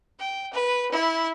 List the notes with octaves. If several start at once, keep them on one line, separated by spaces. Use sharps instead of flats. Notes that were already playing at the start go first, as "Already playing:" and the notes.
G5
B4
E4